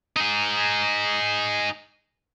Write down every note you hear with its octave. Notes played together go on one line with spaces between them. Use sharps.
D#4 G#4